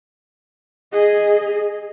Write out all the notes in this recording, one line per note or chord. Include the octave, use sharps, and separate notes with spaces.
G#4 D#5